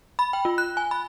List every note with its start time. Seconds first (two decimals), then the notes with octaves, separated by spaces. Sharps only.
0.19 B5
0.33 G5
0.45 F4
0.58 F#6
0.77 G#5
0.91 B5